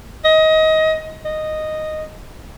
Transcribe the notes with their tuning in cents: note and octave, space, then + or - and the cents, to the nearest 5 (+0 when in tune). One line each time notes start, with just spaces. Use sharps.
D#5 +20
D#5 -5